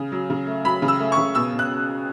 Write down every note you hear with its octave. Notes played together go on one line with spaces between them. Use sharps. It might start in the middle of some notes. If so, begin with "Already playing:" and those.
Already playing: C#3
F#3
C#3
A3
F#3 B5
C#3
E6
A3
C#6
C#3
B2 E6
B2
F#6